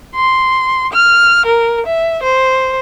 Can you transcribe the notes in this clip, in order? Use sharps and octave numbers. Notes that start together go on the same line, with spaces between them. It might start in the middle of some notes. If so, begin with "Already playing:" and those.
C6
F6
A#4
E5
C5